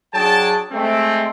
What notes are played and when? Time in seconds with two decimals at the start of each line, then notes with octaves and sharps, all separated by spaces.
0.14 F#3 D4 G#4 G5 A5
0.72 G#3 A3 C4